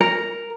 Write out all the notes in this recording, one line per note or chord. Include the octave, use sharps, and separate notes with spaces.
A#4